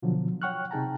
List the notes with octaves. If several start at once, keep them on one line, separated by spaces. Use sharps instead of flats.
B2 D3 F3 F#3
C#5 F#5 G5 C#6 F6 F#6
C3 D#4 G#4 G5 A5 A#5